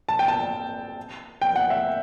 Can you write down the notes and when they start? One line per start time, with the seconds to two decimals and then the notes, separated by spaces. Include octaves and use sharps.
0.09 A5
0.19 G5
0.28 A5
1.42 G5
1.56 F#5
1.70 E5